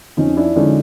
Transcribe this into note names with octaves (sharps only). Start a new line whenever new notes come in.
F2 C#4 D#4
D4 E4
D3 F3 G#3 C#4 D#4